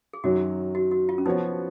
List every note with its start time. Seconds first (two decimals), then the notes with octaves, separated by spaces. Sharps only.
0.13 G#4
0.24 F#2 D#3 F#3 F#4
0.75 F#4
0.91 F#4
1.09 F4
1.18 C#4
1.26 F3 B3 D#4 F#4 C#5